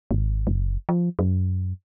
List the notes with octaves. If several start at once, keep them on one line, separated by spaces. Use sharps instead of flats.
G#1
F#1
F3
F#2